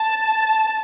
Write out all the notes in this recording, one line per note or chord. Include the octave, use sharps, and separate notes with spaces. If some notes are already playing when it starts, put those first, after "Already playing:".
Already playing: A5